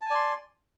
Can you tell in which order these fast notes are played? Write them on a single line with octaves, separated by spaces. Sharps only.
A5 G#5 D5 C6